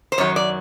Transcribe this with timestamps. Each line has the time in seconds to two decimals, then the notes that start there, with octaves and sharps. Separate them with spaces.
0.12 C5
0.18 F#2 D#3 F#3 C#5
0.36 D5